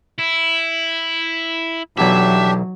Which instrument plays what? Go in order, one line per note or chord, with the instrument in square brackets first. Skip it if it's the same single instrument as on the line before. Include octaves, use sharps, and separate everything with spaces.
[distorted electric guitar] E4
[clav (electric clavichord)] B1 E2 [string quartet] F#3 [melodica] D4 G4 [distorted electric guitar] E5